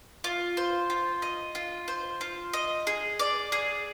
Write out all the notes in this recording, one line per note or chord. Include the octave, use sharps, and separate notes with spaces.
F4
C5
F4
D#5
F4
C5
F4
D#5
G#4
D5
G#4